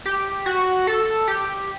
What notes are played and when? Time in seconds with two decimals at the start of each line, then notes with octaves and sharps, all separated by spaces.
0.05 G4
0.46 F#4
0.87 A4
1.28 G4